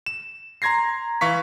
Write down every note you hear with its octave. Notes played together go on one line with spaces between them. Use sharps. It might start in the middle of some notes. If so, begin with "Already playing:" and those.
E7
A#5 C6 G#6 A#6 C7
E3 F5 C#6 B6